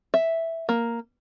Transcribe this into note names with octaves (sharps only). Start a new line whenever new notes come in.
E5
A#3